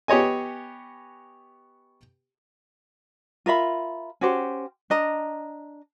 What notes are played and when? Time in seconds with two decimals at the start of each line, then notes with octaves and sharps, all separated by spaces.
0.08 B3 G4 C#5 D#5 G#5
3.46 F4 A#4 E5 B5
4.21 C#4 F#4 G4 C5
4.90 D4 D#5 A#5